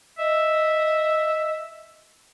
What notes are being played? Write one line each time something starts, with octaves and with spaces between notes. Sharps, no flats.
D#5 E5